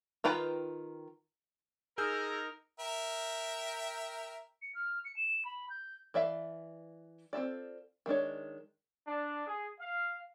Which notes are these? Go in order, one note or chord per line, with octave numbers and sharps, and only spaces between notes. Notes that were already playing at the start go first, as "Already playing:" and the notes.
D#3 F4 B4 G5 A#5
D#4 G#4 A#4 E6 G6
A#4 E5 G5
C#7
F6
C#7
E7
B5
G6
E3 D5 E5 F5
C4 F4 A4 D5
D#3 G#3 D4 C#5
D4
G#4
F5